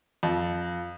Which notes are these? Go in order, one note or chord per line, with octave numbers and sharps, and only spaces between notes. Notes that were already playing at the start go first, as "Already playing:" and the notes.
F2